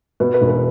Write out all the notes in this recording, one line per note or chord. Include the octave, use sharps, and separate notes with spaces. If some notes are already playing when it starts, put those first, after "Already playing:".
B2 B4
B4
E1
B4